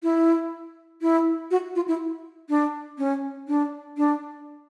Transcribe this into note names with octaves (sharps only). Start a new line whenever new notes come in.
E4
E4
F#4
F4
E4
D4
C#4
D4
D4